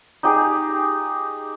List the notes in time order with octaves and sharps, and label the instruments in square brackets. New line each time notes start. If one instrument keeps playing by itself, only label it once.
[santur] D#4 G4 G#4